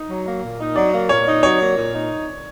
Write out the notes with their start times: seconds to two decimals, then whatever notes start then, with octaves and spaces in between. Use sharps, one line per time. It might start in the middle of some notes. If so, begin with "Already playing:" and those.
Already playing: D#4
0.09 F#3
0.26 A#3
0.43 A#2
0.60 D#4
0.76 F#3 D5
0.93 A#3
1.09 A#2 C#5
1.27 D#4
1.43 F#3 C#5
1.61 A#3
1.77 A#2
1.93 D#4